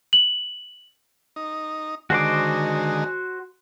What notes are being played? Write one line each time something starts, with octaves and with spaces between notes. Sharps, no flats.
F#7
D#4
D3 D#3 G#3 F#4 C5 D6